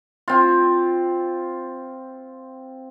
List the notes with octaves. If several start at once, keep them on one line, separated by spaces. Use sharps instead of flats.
C4 F4